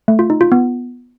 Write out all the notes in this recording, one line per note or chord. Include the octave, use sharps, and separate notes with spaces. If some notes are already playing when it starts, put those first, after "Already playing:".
A3
F4
D#4
F4
B3